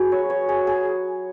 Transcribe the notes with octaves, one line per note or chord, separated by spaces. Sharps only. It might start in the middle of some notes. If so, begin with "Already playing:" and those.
Already playing: F#3 F#4 G#4 B4
C#5
C#5
G#4
G#4